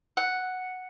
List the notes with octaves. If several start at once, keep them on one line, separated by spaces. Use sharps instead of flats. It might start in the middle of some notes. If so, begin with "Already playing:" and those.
F#5